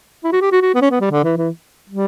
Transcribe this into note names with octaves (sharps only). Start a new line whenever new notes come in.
E4
F#4
G4
F#4
F#4
B3
C#4
B3
G3
D3
E3
E3
G3